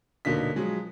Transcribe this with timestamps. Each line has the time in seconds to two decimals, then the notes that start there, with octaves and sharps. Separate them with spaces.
0.25 D#1 B2 D3 A#3 D#4 B6
0.56 F3 F#3 G#3